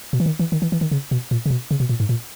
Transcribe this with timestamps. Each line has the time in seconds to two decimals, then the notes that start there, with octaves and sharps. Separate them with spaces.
0.13 B2
0.20 E3
0.26 D#3
0.39 E3
0.52 D#3
0.62 E3
0.72 E3
0.81 D#3
0.91 C#3
1.11 B2
1.31 A#2
1.46 C#3
1.51 B2
1.71 C#3
1.80 B2
1.89 A#2
2.00 G#2
2.09 A#2